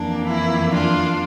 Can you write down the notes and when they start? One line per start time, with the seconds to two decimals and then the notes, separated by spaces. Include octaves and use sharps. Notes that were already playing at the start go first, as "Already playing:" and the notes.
Already playing: F2 E3 A#3 D4
0.28 E4
0.73 D4 F4